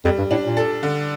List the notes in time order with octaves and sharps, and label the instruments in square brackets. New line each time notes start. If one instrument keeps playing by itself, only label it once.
[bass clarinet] F2 [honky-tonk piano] G3
[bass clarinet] G2
[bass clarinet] A2 [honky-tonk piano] D4
[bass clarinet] A#2
[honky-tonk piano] A4
D3